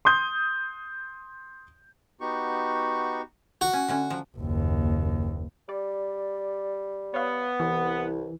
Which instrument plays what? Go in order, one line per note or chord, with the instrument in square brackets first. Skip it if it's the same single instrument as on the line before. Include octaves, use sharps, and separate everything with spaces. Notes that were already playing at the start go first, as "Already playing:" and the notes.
[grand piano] C6 D#6 G6
[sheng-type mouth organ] B3 D#4 F#4 G4 C#6
[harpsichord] F#4
[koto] C#4
D3 A3 C#4
F3 F#3
[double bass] F#1 D#2
[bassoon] G3 [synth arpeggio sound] D5
[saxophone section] B3 [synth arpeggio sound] C#5 F5
[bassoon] C2 [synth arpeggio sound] E3